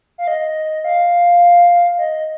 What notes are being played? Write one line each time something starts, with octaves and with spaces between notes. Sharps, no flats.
F5
D#5
F5
D#5